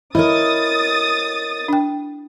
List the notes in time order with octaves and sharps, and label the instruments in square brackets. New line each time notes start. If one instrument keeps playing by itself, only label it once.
[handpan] E4 [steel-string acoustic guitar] A#4 C#5 D#5 [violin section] D#6 A6
[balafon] D4 G5